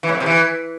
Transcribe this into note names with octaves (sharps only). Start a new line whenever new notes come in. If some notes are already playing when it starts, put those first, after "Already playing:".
E3
A2
F2
C3
E3